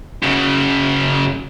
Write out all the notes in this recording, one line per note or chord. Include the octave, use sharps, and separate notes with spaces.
F#2 C#3